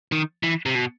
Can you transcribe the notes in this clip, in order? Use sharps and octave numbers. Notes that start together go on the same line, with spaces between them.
D#3
E3
C3
B2